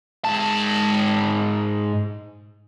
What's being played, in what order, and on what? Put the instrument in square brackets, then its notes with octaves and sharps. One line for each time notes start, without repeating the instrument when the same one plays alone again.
[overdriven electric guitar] G#2 A5